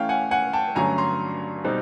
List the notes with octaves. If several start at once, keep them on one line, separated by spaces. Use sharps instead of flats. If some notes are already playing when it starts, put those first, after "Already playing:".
Already playing: E3 A3 C#4 E4 F5 G5
F#5 G#5
F#5 G#5
G5 A5
G2 D3 F#3 A3 C#4 G#5 A#5
A#5 C6
B2 G3 C4 D#4